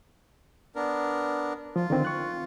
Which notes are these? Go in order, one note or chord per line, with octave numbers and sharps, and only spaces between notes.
B3 D4 A#4
F3 F4
D3 D#3 C4
C#6 F#6